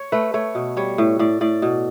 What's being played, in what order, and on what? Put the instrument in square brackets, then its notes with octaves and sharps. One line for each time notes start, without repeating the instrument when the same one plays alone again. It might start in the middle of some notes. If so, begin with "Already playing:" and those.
Already playing: [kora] C#5
A3 B4
A3 C#5
B2
G3 C#5
A2
A2 D5
A2 D5
B2